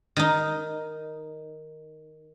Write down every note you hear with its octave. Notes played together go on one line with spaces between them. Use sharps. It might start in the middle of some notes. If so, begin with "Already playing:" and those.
D#3 D#4